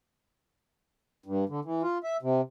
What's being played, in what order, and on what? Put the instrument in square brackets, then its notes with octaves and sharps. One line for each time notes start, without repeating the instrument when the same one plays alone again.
[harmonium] G2
D3
E3
F4
E5
C3